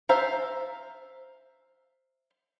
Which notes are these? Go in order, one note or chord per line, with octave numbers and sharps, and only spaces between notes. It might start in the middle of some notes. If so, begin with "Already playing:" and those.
C5 E5 F5 A#5